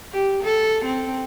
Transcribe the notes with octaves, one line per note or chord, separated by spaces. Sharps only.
G4
A4
C4